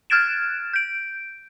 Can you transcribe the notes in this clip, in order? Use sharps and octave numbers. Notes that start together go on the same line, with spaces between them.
F6 F#6 G#6 A6 D7 E7
G6 D7